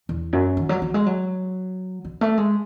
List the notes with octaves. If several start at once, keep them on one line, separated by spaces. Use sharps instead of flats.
E2
F#2
D#3
F#3
F#3
G#3
F#3
F#3
A3
G#3